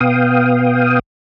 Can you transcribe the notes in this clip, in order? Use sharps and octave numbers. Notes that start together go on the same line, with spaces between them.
B2 B3 F5 G5 D#6